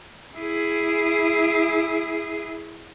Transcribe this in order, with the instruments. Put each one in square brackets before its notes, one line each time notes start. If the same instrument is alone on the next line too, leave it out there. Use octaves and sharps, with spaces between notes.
[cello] E4 G#4